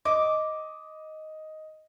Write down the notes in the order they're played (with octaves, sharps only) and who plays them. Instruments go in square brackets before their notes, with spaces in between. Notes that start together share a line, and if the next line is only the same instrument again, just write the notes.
[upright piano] D#5 [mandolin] D6